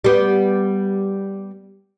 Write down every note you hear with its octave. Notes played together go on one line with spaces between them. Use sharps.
G3 B3